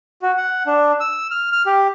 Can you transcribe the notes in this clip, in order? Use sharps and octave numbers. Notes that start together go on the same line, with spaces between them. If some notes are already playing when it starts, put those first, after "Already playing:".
F#4
F#5
D4
E6
F6
F6
G4